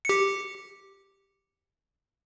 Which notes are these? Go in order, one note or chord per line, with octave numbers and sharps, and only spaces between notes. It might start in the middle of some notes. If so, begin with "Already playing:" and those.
G4 C#7